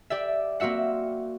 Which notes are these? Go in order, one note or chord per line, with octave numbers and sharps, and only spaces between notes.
G4 D5 E5
A#3 C4 F#4 E5 F#5